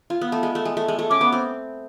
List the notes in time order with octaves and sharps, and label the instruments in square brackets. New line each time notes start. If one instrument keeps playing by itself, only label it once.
[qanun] F4
B3
A3
G#3
A3
G#3
A3
G#3
A3
[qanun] C#4 [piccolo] D6
[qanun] B3
C4